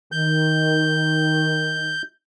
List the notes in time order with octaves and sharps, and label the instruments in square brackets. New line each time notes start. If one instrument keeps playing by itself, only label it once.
[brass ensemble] D#3 [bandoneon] G6